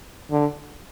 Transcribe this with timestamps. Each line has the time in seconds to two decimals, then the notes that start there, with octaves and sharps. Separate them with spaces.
0.31 D3